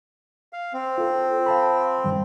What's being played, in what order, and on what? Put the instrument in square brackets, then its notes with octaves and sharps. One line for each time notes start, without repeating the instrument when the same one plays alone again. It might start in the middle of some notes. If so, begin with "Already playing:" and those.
[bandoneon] F5
C4
[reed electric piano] F4 A4
F5 A5 B5
G2 D#3 G3